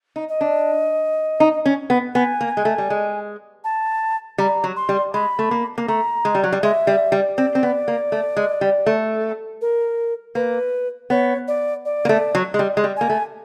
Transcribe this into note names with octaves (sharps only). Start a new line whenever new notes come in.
D#4
D#5
D4
D#4
C#4
B3
B3 G#5
A#3
G#3
A3
G3
G#3
A5
G3 A#5
F#3
C6
G3
G#3 B5
A3
A#3
A#3
A3 A#5
G#3
G3
F#3
G3
G#3 E5
G3
G3
C4 D5
C4
B3
A#3
A3
G#3
G3
A3
A#4
A#3 B4
B3 C#5
D5
D5
A#3
A3
F#3
G#3
G3
G#3
G3
A#3 G#5
A3